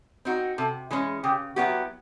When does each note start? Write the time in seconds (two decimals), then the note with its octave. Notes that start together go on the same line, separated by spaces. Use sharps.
0.25 C4 D#4 F#4
0.58 C3 A4
0.91 E3 G#3 C#4 G#4
1.24 C#3 G4
1.56 F#3 B3 E4 F#4 G4